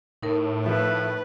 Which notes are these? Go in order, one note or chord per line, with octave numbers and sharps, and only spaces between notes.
A2 D#4 A#4
F3 A4 B4 E5